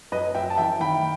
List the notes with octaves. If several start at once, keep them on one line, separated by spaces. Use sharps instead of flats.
F#2 B4 D#5
F#2 E5 G5
A5
E3 E5 G5
D#3 G5 B5